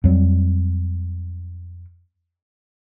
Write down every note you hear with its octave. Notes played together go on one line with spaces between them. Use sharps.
F2 F#3 G3